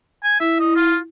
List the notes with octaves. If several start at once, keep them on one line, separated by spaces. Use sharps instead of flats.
G#5
E4 E5
D#5
F4